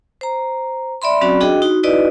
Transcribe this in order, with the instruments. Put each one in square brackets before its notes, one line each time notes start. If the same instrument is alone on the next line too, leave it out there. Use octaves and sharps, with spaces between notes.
[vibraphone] C5 A#5
D5 E5 B5 C6
F#3 C4 C#4 F#4 D5 B5
D4 F#4 G#4 D#5 G5
D#4 F#4
D#4 E4 F#4 B4 D5 D#5